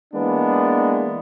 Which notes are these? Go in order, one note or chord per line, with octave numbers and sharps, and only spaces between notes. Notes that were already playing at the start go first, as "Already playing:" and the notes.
E3 G#3 A#3 B3 D4